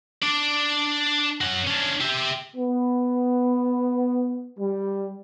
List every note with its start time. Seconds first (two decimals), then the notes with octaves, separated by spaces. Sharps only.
0.23 D4 D5
1.41 C#4 F#4
1.67 C#4 D4
2.01 G4 E5
2.55 B3
4.58 G3